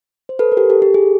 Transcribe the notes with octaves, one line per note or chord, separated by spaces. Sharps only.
C5
A4 B4
A#4
G4 A4
G4 A4
G4 A4
G#4